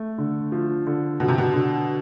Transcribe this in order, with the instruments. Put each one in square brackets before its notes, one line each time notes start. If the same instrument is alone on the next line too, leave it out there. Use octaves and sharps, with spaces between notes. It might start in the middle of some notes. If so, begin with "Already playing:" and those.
Already playing: [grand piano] A3
D3
F3
D3
[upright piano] B2 [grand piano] D3
[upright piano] C3
B2
[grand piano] D3